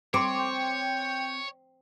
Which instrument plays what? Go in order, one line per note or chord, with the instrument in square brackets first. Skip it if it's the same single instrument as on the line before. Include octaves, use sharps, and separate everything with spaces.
[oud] C4 [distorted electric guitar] C#5 [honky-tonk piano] C6 D6
[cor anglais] G5